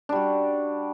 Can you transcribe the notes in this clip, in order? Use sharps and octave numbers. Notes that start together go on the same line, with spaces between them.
G3 D4 F#4